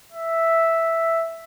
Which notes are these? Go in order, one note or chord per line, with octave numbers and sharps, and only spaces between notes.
E5